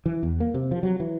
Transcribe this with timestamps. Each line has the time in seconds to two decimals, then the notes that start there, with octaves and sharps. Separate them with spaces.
0.06 E3
0.23 E2
0.40 A#3
0.54 C3
0.71 F3
0.83 F#3
1.00 E3